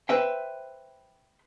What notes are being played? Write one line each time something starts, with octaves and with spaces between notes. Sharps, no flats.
B4 C5 E5 G5